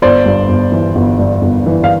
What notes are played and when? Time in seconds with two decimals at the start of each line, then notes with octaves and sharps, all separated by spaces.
0.02 G1 C5 D5
0.26 G2
0.49 G1
0.72 E3
0.96 G1
1.19 G2
1.42 G1
1.66 E3
1.84 F5